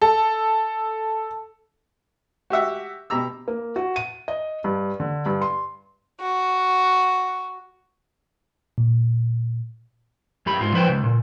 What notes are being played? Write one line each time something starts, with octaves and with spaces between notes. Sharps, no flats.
A4
F#4 G4 E5 F#5
B2 G4 A#5 E6
A#3
F#4
D#7
D#5
G2
D3
G2
C6
F#4
A#2
F#2 G4 B5
G#2 F4
F3 B4 C5 G5
C#2
A#2